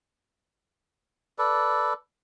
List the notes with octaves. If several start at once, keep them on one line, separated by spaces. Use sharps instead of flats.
A4 B4 D5